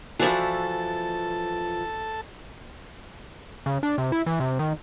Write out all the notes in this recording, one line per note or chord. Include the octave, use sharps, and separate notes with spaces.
E3 F3 F#4 A4 D5 E5 A5
C#3
D4
C3
E4
E3
C3
D#3